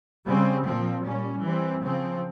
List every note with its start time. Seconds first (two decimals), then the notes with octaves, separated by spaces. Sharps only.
0.25 C#3 G3 C4
0.64 A#2 F3 C4
1.04 A#2 G3 C#4
1.43 E3 G3 C4
1.83 C#3 F3 C4